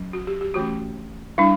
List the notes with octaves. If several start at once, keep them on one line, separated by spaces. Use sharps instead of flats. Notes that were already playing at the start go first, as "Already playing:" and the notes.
Already playing: F#3 C#4
F#4
G4
G4
E3 A3 C#4 F#4
G3 D4 E4